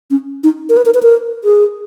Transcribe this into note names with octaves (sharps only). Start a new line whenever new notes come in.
C#4
D#4
A#4
B4
A#4
B4
A#4
G#4